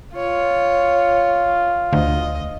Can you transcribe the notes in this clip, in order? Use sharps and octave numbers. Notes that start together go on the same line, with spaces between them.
F4 C#5
D2 D#5